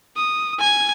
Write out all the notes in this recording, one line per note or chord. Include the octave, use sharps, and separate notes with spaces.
D#6
G#5 G#6